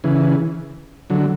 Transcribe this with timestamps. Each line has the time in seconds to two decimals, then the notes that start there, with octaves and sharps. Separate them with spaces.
0.04 C#3 E3
1.10 D3 F#3